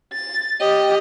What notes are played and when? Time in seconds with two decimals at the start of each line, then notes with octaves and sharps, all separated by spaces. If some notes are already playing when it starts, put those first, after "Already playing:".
0.13 A6
0.61 G4 D#5